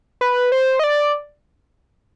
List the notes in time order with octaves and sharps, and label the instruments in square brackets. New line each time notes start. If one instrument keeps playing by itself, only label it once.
[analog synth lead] B4
C5
D#5
D5